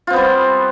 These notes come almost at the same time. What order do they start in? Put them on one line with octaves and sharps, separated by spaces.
F4 C4 B3 G3